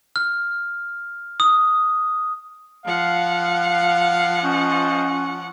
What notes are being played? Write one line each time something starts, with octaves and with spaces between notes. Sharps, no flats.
F6
D#6
F3 F5 F#5
C#4 F4 C5 D#5